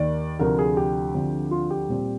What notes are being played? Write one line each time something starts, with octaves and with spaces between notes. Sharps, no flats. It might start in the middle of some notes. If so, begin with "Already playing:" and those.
Already playing: D#2 D#3 A#3 D5
D2 C3 F3 A#4
G#4
G4
D2 D3 F3 C4
F4
G4
A#2 G3 C4